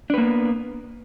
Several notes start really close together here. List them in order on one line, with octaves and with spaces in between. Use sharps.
D4 B4 A#3 B3